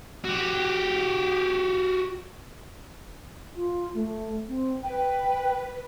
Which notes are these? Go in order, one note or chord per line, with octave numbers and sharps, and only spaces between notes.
F#4 G4
F4
A3
C4
B4 G5